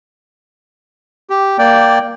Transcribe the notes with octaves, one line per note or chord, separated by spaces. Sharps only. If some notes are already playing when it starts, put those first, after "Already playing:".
G4
A#3 D5 G5